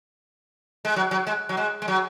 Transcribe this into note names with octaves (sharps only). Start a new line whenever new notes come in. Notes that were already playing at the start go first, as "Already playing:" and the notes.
G#3
F#3
F#3
G#3
F#3
G#3
G#3
F#3